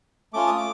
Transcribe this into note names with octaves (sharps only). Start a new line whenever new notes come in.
A3 C#4 F4 D6
D#6
D6